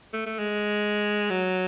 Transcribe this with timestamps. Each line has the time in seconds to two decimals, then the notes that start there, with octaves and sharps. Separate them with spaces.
0.14 A3
0.26 A3
0.39 G#3
1.30 F#3